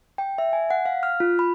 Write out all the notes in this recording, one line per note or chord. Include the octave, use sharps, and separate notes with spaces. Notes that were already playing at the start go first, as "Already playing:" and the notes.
G5
E5
G#5
F#5
F5
F6
F4
B5